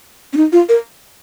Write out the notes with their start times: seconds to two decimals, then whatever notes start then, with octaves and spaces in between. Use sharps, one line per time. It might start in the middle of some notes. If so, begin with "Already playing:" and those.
0.33 C#4
0.37 D#4
0.52 F4
0.69 A#4